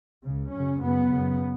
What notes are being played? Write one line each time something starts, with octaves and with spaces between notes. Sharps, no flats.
C#2 C#3
F#2 C#3 C#4
F#2 C#3 B3
F#2 C#3